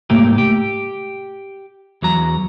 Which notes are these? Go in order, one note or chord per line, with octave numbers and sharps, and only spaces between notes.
C2 G#2 A3 A#3 G4
G4
E2 F#3 A#5